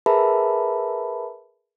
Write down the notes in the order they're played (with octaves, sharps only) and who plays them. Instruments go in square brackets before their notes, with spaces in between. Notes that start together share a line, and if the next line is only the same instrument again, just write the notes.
[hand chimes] G#4 A#4 B4 E5 A5 B5